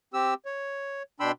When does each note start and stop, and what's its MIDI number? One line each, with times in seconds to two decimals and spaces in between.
0.14 0.34 60
0.14 0.34 67
0.14 0.34 88
0.45 1.03 73
1.20 1.32 47
1.20 1.32 62
1.20 1.32 79
1.20 1.32 83
1.20 1.32 84
1.20 1.32 88